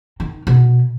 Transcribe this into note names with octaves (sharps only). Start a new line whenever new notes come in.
D#3
B2